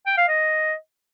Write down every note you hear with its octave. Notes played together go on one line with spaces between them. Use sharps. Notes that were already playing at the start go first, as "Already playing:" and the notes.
G5
F5
D#5